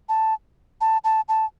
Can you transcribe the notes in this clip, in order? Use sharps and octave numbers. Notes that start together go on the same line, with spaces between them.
A5
A5
A5
A5